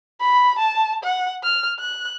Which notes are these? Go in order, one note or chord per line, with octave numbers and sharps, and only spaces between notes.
B5
A5
F#5
F6
F#6